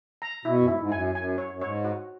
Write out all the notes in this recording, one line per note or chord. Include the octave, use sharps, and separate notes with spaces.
A#5
B2 E4
F#2
G#2 E4
G#2
F#2 G#5
F#2 G#5
C#5
F#2
G#2 C#5
F#4